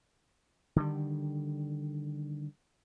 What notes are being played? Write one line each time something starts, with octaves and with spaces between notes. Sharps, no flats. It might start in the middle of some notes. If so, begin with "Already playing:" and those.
D3 D#3 G3